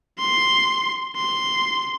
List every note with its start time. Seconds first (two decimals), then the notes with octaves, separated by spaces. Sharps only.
0.19 C6
1.16 C6